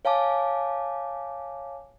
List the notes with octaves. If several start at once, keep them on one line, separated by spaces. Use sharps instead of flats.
C#5 F5 G#5 A5 D6